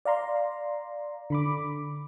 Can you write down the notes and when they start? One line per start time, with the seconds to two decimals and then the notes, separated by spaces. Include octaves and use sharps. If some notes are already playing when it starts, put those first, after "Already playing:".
0.05 D5 F5 A#5 C6
1.30 D3 B5 D6